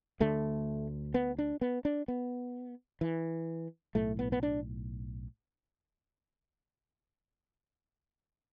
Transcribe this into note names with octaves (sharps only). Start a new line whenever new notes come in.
D2 D3 A3
B3
D4
B3
D4
B3
E3
B1 A2 A3
B3
B3
D4